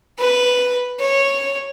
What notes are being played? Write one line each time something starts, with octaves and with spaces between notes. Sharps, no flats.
B4
C#5